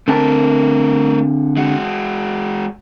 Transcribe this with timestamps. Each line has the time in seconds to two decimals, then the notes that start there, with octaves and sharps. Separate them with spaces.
0.08 D3 A3 C4 A#4 A5
1.57 G#3 F#4